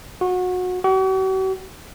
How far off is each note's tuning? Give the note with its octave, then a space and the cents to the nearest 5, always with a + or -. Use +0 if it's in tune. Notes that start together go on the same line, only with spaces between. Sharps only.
F#4 -25
F#4 +45